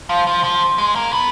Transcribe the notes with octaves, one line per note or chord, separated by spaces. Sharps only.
F3
F3
F3
G#3
A#3
B3